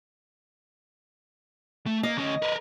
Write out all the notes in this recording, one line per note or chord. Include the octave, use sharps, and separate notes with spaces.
A3
A#3 D#5
D2 C#4
A#4 B4